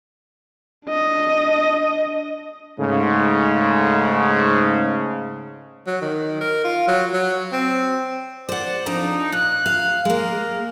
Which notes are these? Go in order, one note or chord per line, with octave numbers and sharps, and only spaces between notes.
D4 D#5
G#2 C#3 A3
F#3
D#3
A#4
F4
F#3
F#3
C4
C5 D5 F#5
F2 D4 D#4 A#5
A#2 F#6
F5
G#3 A#3 A#4